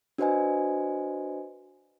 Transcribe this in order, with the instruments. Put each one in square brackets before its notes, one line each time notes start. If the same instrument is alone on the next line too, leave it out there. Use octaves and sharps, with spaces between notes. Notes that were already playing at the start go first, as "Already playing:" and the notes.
[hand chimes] D4 F#4 B4 C5 D#5 G#5